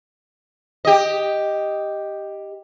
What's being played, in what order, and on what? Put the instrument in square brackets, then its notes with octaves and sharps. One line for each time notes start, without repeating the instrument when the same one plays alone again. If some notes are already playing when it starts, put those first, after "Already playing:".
[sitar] G4 D#5